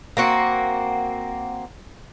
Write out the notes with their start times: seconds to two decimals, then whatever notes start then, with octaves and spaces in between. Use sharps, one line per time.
0.17 A#3 C4 F#4